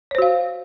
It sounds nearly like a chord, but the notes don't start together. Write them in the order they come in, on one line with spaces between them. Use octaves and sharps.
C#5 C5 F#4 F5